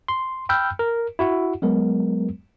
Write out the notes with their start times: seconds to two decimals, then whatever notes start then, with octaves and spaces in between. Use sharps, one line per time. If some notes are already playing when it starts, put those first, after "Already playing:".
0.08 C6
0.49 G5 B5 E6 F6 G6
0.79 A#4
1.19 E4 F#4 F#5
1.62 F#3 G#3 B3 A#4